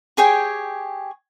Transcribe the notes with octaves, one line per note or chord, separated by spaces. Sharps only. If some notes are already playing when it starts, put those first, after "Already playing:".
G4 G#4 C#5 G5